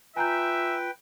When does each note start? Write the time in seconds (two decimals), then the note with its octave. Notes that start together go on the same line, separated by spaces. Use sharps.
0.16 F4 B4 E5 G5 G#5 A#5 G6